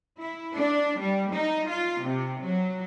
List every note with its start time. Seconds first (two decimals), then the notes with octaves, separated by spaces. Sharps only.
0.20 E4
0.57 D4
1.01 G3
1.35 D#4
1.71 F4
2.07 C3
2.44 F#3